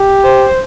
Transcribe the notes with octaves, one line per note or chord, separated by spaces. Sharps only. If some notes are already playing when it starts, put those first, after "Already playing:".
Already playing: G4
C5